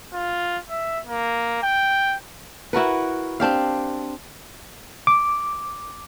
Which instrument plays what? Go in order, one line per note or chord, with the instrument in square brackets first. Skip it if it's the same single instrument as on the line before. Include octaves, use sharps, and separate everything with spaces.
[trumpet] F4
E5
A#3
G5
[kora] E4 F#4 A#4 B4
C4 D4 G4 F5
[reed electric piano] D6